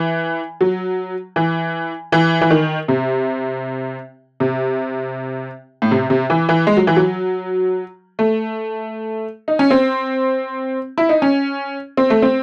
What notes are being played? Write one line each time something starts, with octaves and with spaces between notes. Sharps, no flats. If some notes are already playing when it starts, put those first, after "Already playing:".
Already playing: E3
F#3
E3
E3
E3
D#3
C3
C3
A2
C3
C3
E3
E3
G#3
F#3
E3
F#3
A3
D#4
C#4
C4
E4
D#4
C#4
C4
A3
C4